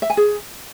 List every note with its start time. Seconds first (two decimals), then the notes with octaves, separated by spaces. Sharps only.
0.02 E5
0.10 G#5
0.17 G#4